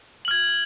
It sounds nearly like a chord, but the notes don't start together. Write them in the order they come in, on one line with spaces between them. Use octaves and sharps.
F#7 F6 G#6